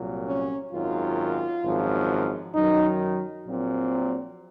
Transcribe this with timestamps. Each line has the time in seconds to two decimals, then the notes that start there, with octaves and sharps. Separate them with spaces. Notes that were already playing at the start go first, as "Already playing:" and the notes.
Already playing: C2 A#2 F#3
0.27 C#4
0.73 G#1 F#2 D#3 F4
1.63 G#1 F#2 F3
2.54 F#2 D#3 F#3 D#4
3.46 A#1 A#2 F#3 C4